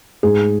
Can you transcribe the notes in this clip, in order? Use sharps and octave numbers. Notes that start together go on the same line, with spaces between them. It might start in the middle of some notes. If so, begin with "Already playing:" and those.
G#2 G#4